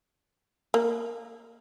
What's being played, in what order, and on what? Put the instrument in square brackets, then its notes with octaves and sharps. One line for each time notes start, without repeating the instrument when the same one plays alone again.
[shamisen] A#3